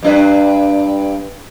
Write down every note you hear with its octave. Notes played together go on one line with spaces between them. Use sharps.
G2 D4 B4